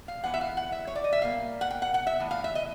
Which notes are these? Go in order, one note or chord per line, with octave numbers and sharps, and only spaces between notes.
F5
E3 G#3 B3 F#5
E5
F5
F#5
E5
C#5
D5
D#5
E5
A#2 G3 A#3 F5
F#5
G5
F#5
F#5
E5
A2 E3
F5
E5
D#5